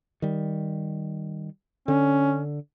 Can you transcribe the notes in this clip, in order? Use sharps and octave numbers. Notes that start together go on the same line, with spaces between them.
D#3 G3
D3 C#4